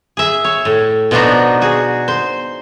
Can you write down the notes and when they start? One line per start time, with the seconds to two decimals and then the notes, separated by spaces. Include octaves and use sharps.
0.17 G#4 E5
0.44 C#5
0.65 A2
1.11 B2 F3 B3 D4 D#4 F#4
1.61 F#4 G#4
2.08 C5